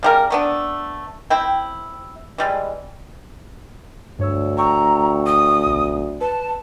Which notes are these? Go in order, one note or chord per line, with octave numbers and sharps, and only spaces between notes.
C#3 G3 A#4
A3 B3 D4
C4 E4 G5
E3 G3 G#3
D2 G2 C#5 E6
G5 A#5 C#6 E6
D#6
B1
B4 A5